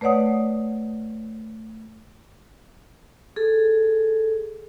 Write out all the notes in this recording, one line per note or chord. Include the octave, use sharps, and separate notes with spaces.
A3 B4 C#5 D5 F#5 D#6
G#4 A4